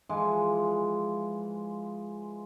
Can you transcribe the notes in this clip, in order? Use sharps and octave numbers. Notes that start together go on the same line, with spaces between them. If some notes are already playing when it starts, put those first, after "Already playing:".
E3 F3 G#3